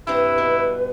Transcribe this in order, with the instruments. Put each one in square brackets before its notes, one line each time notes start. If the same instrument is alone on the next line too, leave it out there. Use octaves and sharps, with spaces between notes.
[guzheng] G2 C3 C4 [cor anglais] E4 [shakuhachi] B4
[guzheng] B2